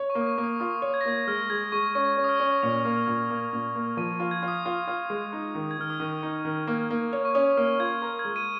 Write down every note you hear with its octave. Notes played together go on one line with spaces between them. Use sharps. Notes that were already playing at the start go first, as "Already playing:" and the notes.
Already playing: C#5
C#6
A#3
D#6
C#6
A#3
D#6
F4 D#6
C#5
G#6
A#6
A#3 G#6
G#3 F6
G#3 G#6
G#3 C#6
C#4 C#6
C#4
D#6
F6
C#4
A#2 F7
A#3
A#2
A#3
A#2
A#3
F3 D#7
F4
G#6
F4
D#6
F4
F4
G#3
D#4
D#3
G#6
D#3 F6
D#6
D#3 C#6
D#4
D#3
A#3
A#3
C#5
C#6
C#4 D#6
A#3 F6
F4 G#6
A#4
G#6
G#3
D#7